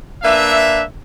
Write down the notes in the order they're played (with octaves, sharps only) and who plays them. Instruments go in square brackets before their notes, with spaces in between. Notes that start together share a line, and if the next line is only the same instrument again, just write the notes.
[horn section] A#3 D4 B4 E5